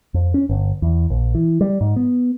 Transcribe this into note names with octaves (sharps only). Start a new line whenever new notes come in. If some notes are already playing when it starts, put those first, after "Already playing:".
F2
C#4
G1
E2
A#1
E3
G3
G#2
B3